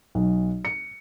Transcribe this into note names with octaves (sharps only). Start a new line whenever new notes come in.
B1
C#7